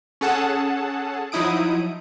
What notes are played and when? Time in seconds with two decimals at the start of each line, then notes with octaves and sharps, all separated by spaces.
0.21 C#4 G#4 A4 F#5 A5
1.32 F3 F#3 D#4 E4 D#6 D7